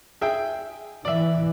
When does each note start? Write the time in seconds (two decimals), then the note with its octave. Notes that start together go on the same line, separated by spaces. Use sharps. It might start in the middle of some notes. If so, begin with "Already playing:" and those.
0.21 G#4 E5 G5
1.05 E3 D5 E5